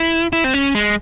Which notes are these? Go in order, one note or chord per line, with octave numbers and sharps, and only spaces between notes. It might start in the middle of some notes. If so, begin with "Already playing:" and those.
Already playing: E4
E4
C4
C#4
G#3